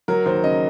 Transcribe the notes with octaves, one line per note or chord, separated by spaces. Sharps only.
F#3 A#4
D#2 C5
C#3 D#5